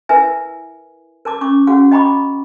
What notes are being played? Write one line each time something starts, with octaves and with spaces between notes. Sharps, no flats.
E4 A#4 B4 E5 G#5
A#4 A5 D6
C#4 C#6 D6
C#4 F#4 G#4 F5 F#5
D#5 G5 A#5 B5 C#6 D6